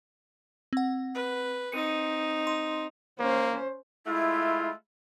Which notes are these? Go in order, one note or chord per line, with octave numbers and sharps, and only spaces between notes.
C4 F#5
B4
C4 D#4 C#7 D#7
C6
A#3 C#4 C5
G#3 A3 E4 F4